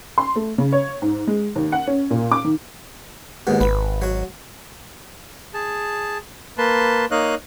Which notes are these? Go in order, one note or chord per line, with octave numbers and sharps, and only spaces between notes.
C6
A3
C#3
C#5
G#2
G#3
D#2
F#5
C#4
A#2
D6
D#3
D#2 G#2 B2
G#1 B4
F#3 F#4
G#4 A5
A#3 B4 A5 C6
A#3 D#4 C#5 D#5 F5 F#6